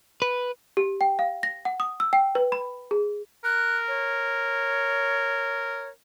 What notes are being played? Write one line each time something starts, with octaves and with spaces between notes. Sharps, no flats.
B4
G4
G5
F5
A#6
F#5
D#6
E6
G5
B4
B5
G#4
A#4 F#6
C#5